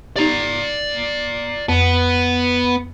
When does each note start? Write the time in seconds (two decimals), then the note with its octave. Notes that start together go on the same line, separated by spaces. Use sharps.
0.16 D#4 G4 D5 A#5
1.68 F2 B3